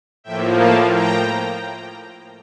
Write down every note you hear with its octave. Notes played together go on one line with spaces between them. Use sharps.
A2 F3 A#3 E5 G5
F5 A5
G5 A#5